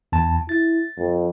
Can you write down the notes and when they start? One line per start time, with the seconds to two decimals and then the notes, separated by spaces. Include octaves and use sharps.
0.12 E2 A5
0.49 E4 A6
0.98 F2